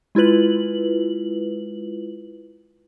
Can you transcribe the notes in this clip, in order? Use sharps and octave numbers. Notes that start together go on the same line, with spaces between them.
G#3 E4 F4 B4 F#7